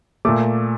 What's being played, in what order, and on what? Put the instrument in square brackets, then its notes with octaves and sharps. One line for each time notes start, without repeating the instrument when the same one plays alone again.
[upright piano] A#2 A3 D6